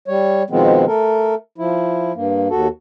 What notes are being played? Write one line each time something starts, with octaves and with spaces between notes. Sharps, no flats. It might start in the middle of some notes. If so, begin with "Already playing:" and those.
G3 C#5
B2 D#3 F3 G#3 B3 C4
A3 A4 A#4
F3 E4
G2 A#3
D#2 F#4 A4